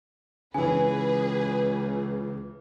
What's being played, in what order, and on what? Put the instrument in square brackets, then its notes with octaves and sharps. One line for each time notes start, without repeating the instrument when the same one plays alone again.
[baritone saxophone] C#2 [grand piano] C#3 E3 [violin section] G#4 B4 [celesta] G#5